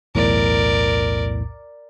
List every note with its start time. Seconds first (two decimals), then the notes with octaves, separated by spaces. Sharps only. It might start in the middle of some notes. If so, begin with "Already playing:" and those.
0.15 B1 E2 A2 A#4 D5